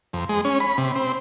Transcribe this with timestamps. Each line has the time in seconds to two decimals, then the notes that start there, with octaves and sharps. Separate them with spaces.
0.13 F2
0.29 G#3
0.45 C#4
0.60 B5
0.78 C3
0.95 C4